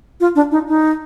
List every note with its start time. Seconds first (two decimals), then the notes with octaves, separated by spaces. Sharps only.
0.20 F4
0.35 D4
0.52 D#4
0.68 D#4